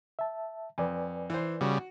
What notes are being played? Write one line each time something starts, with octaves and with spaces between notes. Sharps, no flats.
E5 A5
F2 B4 D5 G#5
E3 C5
C#3 G3 F#4